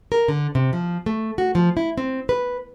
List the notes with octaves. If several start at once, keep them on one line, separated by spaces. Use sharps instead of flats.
A#4
D3
C3
F3
A3
F#4
F3
E4
C4
B4